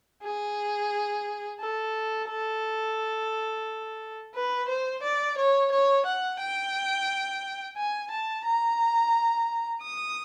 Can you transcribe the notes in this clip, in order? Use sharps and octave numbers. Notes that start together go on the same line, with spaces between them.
G#4
A4
A4
B4
C5
D5
C#5
C#5
F#5
G5
G#5
A5
A#5
D#6